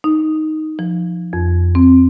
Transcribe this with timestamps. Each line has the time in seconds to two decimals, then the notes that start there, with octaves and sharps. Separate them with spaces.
0.04 D#4
0.79 F3
1.33 F2
1.75 C4